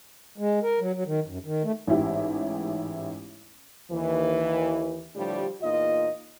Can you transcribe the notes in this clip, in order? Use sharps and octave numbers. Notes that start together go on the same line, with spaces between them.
G#3
A#4
F#3
F#3
D#3
F#2
D#3
A3
A1 G#2 E4 G4
D#2 E3
A2 D3 F3 G3
E2 A#2 D#4 F4 D#5